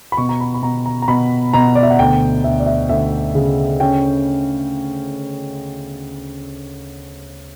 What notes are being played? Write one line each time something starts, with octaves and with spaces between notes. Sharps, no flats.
B5
B2 C#6
A#5
B5
B5
B2 A#5
A#5
A#5
B2 B5
B2 A#5
D5
E5
F#5
D2 G5
D2 E5
D5
E5
D2 E5
C#3
C#4 G5